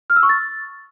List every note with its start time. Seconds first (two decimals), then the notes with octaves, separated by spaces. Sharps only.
0.10 F6
0.16 E6
0.23 C#6
0.29 A6